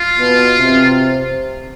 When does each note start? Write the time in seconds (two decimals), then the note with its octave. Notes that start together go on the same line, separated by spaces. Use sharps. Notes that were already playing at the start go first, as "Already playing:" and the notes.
Already playing: F4
0.19 B2
0.58 C3